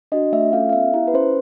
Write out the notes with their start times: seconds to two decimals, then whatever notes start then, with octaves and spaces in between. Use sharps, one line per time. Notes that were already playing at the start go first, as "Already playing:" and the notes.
0.12 D4 F#4 D#5
0.32 A3 E5
0.52 C#4 F4 A4 F5
0.69 F5
0.73 B3 E5
0.94 E4 G4
1.08 B4
1.14 C#4 C5